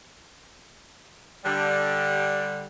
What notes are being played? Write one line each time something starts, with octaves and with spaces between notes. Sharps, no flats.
D3 G3